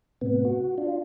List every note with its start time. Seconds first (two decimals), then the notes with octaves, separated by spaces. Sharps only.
0.21 A2 C3 B3
0.45 F#4
0.78 D4 F4